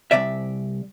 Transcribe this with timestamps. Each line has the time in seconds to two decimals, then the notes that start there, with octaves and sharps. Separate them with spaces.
0.11 C2 G#2 C3 D5 E5